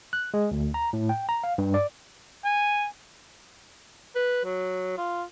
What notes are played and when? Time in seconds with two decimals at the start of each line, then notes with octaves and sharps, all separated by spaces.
0.13 F#6
0.34 G#3
0.51 D2
0.74 A#5
0.93 A2
1.09 G5
1.29 A#5
1.44 F5
1.58 G2
1.74 D5
2.44 G#5
4.15 B4
4.44 F#3
4.97 F4